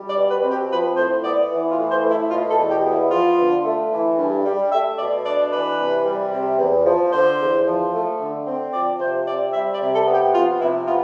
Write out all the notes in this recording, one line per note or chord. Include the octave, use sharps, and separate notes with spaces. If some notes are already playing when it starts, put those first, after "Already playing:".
Already playing: G3
D5
B2
B4
C4
G4
F3 B4
A2 C5
B3 D5
E3
F4
A2
C5
A3
E4
B2 F4
A4
E2
G4
B3
E4
F3 F4
D3
A3
E3
G2
G3
A3 E5
B2 D5
D4 D5
E3 B4
C3
G3
C3
E2
F3
D3 C5
E2
F3
A3
D3
C4
F3 D5
C3 C5
C4 D5
G3 E5
D5
C3
A4
B3
G4
F3 F4
C3 E4
B3 F4